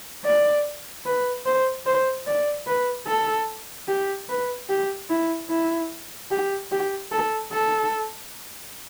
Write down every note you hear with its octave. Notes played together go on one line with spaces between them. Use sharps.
D5
B4
C5
C5
D5
B4
A4
G4
B4
G4
E4
E4
G4
G4
A4
A4